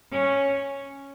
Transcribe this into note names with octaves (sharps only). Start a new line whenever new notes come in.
C#4